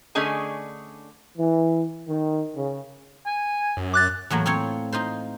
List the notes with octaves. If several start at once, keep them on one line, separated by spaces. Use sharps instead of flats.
D3 A3 C#4 G#4 D#5 G#5
E3
D#3
C#3
G#5
F#2
D6 F#6 A6
E2 A2 F#3 A#3
C4 F4 C#5
D#4 F4 C5